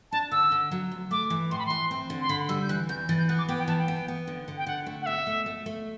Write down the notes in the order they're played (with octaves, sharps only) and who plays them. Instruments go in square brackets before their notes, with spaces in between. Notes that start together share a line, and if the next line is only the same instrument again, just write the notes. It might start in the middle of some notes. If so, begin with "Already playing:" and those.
[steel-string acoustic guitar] D4 [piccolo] A5
[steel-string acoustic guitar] D3 [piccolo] E6
[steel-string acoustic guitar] D3
F#3
D2
[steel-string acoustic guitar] A3 [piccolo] D6
[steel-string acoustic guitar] E3
[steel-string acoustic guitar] A2 [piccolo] C6
[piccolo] B5
[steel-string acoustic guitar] E3 [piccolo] C6
[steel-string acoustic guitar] C4
D3
[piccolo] C6
[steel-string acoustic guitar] D3 [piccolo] B5
[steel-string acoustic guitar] G3 [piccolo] E6
[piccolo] G6
[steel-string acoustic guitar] E3 [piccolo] F#6
[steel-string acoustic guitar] E2 [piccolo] G6
[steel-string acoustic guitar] E3 [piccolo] A6
[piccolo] G6
[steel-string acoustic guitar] B3 [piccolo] F#6
[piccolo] D6
[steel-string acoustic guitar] B3 [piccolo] G5
[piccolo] G5
[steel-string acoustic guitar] E3 [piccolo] A5
[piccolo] G5
[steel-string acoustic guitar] B3
B3
D3
D3
[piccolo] G5
[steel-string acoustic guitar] D3 [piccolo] F#5
[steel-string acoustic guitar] A3
[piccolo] F#5
[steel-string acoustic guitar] B2 [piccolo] E5
[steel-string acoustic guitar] A3
A3
A3